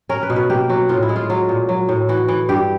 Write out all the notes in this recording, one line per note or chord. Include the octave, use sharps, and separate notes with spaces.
C#4 A#4
B4
B2
B4
A#3 G4
F#3 F#4
A2 F4
E4
G#3
F4
F#3 F4
A#2
F#3
A2
E3 F#4
E3
G2 G4